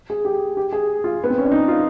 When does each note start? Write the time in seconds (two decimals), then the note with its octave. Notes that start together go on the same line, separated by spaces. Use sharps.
0.10 G#4
0.25 G4
0.57 G4
0.73 G#4
1.04 F4
1.24 B3
1.30 C4
1.38 C#4
1.45 D4
1.52 D#4
1.68 F4